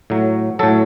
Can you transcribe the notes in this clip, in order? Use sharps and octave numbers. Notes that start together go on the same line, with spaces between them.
A2 F#3
A2 F#3 A4